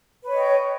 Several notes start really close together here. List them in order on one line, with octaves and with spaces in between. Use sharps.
B4 C#5 D#5 G5